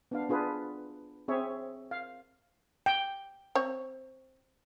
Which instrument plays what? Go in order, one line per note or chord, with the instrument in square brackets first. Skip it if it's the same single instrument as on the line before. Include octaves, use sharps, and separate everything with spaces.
[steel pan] B3 D4 F5
D4 F4 G#4 B4
C4 G#4 C#5 E5
F5
G5
[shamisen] C4 C#5